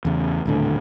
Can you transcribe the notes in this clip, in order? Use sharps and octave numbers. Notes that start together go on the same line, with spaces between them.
E2 C#3
D#1 A2 D3